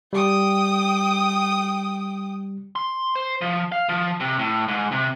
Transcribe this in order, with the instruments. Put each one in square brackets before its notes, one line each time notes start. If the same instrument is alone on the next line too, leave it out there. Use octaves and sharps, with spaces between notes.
[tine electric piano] G3 [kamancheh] G5 D#6
[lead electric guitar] C6
C5
F3
F5
F3
C3
A2
G#2
C3